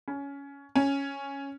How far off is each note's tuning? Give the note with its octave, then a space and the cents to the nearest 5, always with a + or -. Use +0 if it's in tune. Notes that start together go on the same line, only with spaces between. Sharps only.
C#4 +15
C#4 +0